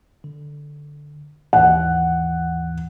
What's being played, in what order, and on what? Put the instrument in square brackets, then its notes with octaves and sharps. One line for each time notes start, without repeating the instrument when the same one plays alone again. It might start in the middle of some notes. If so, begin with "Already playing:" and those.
[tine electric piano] D3
[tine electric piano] D#2 G#2 E3 [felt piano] F#5